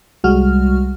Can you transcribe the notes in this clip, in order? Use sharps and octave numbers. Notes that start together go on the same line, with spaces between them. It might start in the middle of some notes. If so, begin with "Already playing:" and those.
C2 G3 G#3 F#4 F6